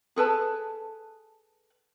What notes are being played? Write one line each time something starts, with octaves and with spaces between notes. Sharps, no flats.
G#4 A4 B4 A5